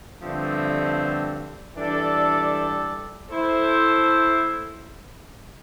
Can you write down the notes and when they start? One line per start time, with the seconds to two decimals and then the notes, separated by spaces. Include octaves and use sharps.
0.22 G2 D3 F3 A3 C4
1.76 E3 G3 D4 A4 D5
3.30 A3 E4 A4 C5